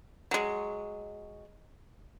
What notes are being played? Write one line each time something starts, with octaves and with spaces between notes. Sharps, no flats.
F#3 G#3